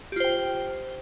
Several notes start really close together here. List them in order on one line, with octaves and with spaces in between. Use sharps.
G4 F4 C5 G5